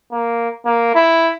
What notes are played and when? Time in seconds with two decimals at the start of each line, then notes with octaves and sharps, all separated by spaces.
0.12 A#3
0.65 A#3
0.95 E4